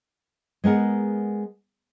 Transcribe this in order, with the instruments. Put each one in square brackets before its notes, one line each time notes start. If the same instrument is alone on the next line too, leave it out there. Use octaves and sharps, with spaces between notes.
[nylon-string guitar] G#3 B3 A#4 F#5